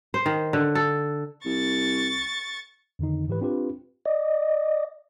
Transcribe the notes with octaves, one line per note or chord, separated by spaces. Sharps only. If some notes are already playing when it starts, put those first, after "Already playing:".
C5
D#3
D3
A4
C2 C#6 A6
F2 D3 D#3 D#4
G#2 E3 G4 B4
C4 D4 F4 G4 B4
D5 D#5